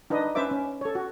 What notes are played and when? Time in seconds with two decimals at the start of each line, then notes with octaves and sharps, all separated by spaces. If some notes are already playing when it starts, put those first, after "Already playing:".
0.10 D4 D#4 B4 D#5
0.35 C#4 B4 C5 E5 D6
0.51 C#4
0.81 A4 C#5
0.95 F#4